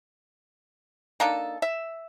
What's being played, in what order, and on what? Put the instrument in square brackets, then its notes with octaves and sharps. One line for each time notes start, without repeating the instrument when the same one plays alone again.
[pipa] A#3 D4 D#4 A4
E5